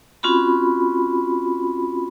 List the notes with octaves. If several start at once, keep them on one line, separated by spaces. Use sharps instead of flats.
C4 C#4 F4 F#4 B5